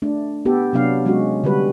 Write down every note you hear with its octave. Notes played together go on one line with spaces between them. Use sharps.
A3 D4
B3 G4 A4
C3 F#3 B3 D4 F5
F#3 G#3 C#4 F#4
D3 G3 F#4 B4